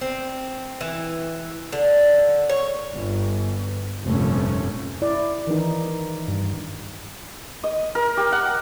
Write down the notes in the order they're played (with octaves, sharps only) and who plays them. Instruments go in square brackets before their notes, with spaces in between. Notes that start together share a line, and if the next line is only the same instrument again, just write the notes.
[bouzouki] C4
E3
D3
C#5
[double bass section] G1
F1 A#1 G2 F3 A3 C#4
[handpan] E4 D5
D#3 E3 D#4
[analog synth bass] G2
[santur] D#5
A#4
G4
F#5